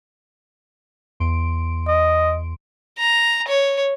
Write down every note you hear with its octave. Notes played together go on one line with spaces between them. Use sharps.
E2 C6 D7
D#5
A#5
C#5